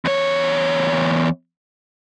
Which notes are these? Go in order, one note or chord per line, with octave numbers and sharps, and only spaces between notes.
E2 C#5